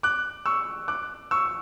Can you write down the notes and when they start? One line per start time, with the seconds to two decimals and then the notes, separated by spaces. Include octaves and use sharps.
0.03 D6 F#6
0.46 C#6 E6
0.88 D6 F#6
1.31 C#6 E6